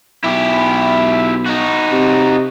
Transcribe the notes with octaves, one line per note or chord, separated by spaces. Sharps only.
B1 E4 G4
D#4 F#4
C3